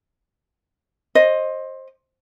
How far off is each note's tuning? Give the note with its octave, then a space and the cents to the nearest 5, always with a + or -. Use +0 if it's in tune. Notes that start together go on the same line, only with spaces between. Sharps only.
C5 +20 D#5 +0